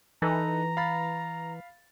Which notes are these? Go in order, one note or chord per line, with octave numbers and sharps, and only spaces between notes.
E3 D#4 A4 B4 A#5
F5 B5 A6